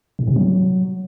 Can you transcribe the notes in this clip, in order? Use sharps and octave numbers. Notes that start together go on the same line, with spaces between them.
A2
C3
F#3